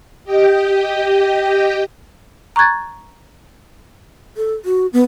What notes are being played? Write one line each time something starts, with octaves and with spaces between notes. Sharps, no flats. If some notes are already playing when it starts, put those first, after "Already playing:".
G4 D#5 G5
A#5 C#6 F#6 G#6 A6
A4
F#4
B3